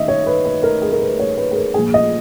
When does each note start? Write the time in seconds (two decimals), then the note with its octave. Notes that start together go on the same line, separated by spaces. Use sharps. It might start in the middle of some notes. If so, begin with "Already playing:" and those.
Already playing: D#3 D#5 E5
0.08 C#5
0.26 B4
0.45 B4
0.63 A#4
0.82 G#4
0.92 A#4
1.01 B4
1.19 C#5
1.38 B4
1.51 G#4
1.57 A#4
1.74 A#1 A#2 A#3 G#4
1.94 D#5